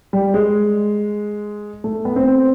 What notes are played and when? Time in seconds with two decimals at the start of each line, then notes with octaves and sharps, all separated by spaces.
0.13 G3
0.34 G#3
1.84 A3
2.05 B3
2.16 C4